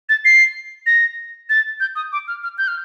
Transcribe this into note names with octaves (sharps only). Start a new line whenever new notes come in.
A6
C7
A#6
A6
G6
D#6
D6
F6
F6
G6
F6